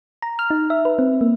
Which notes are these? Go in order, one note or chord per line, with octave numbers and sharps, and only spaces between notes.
A#5
F6
D#4
E5
B4
C4
A#3